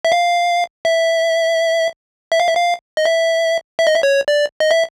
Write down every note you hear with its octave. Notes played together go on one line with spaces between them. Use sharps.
E5
F5
E5
E5
F5
E5
F5
D#5
E5
E5
D#5
E5
C#5
D5
D#5
E5